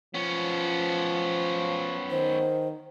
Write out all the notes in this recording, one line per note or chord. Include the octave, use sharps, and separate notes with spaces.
F3 B3 C#4
D#3 C5